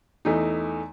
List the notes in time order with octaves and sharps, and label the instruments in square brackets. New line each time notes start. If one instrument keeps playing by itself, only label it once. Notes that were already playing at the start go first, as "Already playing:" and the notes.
[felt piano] E2 A3 D#4